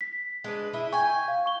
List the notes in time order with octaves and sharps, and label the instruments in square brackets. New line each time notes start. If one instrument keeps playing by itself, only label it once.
[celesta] B6
[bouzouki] G#3 D4 B4
E4 D#5 E5
[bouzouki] G5 G#5 [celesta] C#6
[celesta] F5
C#6 G7